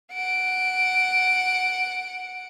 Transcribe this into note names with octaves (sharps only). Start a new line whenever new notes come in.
F#5 D7